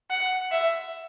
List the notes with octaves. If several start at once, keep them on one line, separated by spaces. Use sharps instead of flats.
F#5
E5